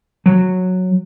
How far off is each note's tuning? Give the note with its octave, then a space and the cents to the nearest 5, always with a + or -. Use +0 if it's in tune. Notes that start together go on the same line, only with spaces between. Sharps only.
F#3 -10